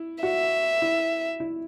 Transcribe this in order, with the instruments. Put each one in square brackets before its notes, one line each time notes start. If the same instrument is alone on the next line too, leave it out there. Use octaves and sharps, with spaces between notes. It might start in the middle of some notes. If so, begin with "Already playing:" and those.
Already playing: [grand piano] E4
[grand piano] F#4 [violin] E5
[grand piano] E4
E4